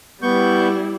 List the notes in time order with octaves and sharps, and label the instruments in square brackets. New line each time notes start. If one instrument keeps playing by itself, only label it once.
[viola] G3 E4 [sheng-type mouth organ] B3 C#6 G6